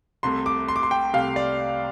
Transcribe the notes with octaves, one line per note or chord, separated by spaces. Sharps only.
C2 C3 A3 C6
D6
C6
D6
C6
G5
C2 C3 A3 F5
D5